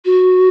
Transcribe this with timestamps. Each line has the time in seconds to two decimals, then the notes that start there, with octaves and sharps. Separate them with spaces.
0.05 F#4